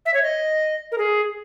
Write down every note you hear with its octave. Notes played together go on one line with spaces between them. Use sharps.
E5
C#5
D#5
A#4
G#4